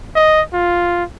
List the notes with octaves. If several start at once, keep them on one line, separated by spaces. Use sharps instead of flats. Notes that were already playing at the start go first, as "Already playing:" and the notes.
D#5
F4